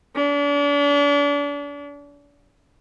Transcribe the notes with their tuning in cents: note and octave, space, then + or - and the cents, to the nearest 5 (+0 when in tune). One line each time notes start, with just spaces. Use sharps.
D4 -40